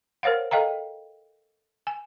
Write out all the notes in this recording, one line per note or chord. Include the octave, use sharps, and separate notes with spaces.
A#4 C5 C#5 F5 F#5
A4 D#5 F5 G5 A#5
G#5